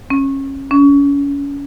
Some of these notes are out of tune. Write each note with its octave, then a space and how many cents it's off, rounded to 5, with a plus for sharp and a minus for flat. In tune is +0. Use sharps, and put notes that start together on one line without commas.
C#4 -25
C#4 +30